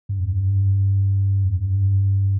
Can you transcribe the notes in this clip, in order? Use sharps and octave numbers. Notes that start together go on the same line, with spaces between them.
G2
F2
G2
F2
G2